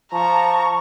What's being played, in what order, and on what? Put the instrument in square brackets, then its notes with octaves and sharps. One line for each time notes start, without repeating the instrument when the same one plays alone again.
[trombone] F3 [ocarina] A5 [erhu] A#5 [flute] C#6